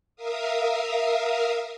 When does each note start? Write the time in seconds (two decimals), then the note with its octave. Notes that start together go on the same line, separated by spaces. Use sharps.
0.16 A#4 E5 F5 D#6